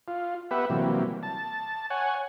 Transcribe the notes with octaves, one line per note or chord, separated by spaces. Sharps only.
F4
B3 G4 B4 E5 F#5
C3 E3 F#3 G3 A#3
A5
C#5 F#5 G#5